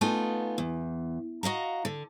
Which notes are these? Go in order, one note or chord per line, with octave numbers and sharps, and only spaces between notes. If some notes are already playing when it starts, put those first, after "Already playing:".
A3 B3 D#4 F4 G#5
E2
F#4 D#5 F5 A#5
D3